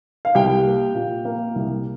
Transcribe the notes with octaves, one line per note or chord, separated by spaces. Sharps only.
F5
C2 G4 G5
A#3
A#2
A#3
C2